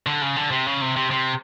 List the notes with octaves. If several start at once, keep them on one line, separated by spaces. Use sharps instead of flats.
D3
C#3
D3
C3
C#3
C3
C3
C3